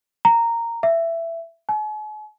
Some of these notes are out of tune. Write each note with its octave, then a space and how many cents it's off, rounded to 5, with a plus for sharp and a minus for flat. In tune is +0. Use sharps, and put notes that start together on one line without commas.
A#5 -10
E5 +15
G#5 +45